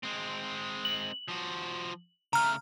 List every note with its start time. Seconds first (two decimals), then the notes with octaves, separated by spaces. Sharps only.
0.03 G#3 C4
0.85 F#7
1.28 F3 F#4
2.33 C#3 A3 A#5 F6